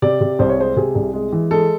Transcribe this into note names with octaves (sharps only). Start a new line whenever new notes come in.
C3 D5
C3
C2 C5
C#5
G#3 C5
C3 G#4
C2
G#3
E3
G#3 A4